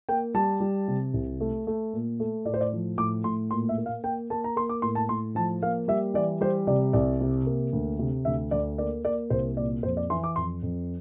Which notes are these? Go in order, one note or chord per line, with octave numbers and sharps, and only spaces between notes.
A#3 G5
G3 A5
G3
C3
C2
A3
A3
A#2
A3
A2 D5
C5
D5
F3
A2 D6
A2 C6
A#2 C6
E5
A#3
F5
A#3 G5
A#3 A5
A#5
A#3 C6
D6
A2 C6
A5
A2 C6
F3 A5
A#3 F5
G3 E5
E3 D5
G3 C5
C3 D5
C2 D5
C3
A#3
D2
C3
D2 E5
D2 D5
A#3 D5
A#3 D5
C2 C5
A#2 D5
F2 C5
D5
E3 C6
D6
F2 C6
F2